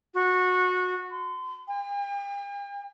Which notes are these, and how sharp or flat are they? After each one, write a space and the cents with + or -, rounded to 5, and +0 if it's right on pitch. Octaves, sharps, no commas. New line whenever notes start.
F#4 -20
C6 -40
G5 +45